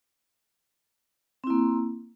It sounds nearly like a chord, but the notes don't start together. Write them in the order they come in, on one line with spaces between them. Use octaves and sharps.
C4 E4 A#3